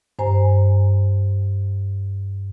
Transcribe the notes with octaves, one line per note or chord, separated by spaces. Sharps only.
G2 C5 G#5 A#5